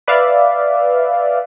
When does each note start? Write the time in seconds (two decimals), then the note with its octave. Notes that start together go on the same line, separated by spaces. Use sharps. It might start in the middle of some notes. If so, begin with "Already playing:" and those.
0.08 B4 D5 E5 F5